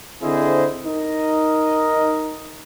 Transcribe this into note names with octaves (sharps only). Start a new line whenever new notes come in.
D3 C4 E4 G#4 C5 D#5
D#4 A#4 D#5